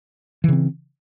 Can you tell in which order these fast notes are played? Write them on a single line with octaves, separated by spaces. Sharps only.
E3 C#3 C4